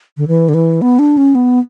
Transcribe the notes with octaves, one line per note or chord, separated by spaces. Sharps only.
D3
E3
D3
E3
B3
D4
C#4
B3